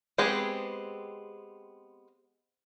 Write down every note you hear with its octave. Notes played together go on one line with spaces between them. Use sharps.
G#3 B3 C4 G4 G#4